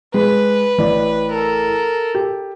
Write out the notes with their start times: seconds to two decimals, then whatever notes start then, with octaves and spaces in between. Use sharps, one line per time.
0.14 G#3 B4
0.78 A1 E3 D5
1.32 A4 A#4
2.15 G4